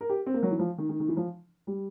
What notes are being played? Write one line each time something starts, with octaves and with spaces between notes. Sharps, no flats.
A#4
G4
C4
A#3
F#3
E3
F3
D#3
D#3
D#3
E3
F3
G3